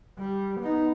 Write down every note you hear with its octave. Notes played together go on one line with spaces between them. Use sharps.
G3
B3 D#4